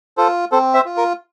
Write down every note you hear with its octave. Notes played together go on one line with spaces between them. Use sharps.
F4 A4 C5
C4 A4 C5
C5 E5
F4
A#4